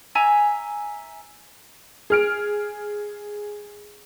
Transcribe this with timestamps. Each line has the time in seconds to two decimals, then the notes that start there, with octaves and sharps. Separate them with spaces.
0.15 E5 G#5 A#5
2.10 G#4 F6 D7